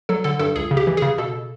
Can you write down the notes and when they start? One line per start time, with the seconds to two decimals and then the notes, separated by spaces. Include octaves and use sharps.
0.09 F#3 A4
0.24 D3 A4
0.39 G2 A4
0.56 C#2 G#4
0.71 C#3
0.77 G4
0.87 E3
0.97 C#3 G#4
1.18 B2 A4